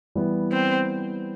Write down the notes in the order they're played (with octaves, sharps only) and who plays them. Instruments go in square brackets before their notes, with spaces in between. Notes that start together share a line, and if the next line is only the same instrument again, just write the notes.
[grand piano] E3 G3 B3
[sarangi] C4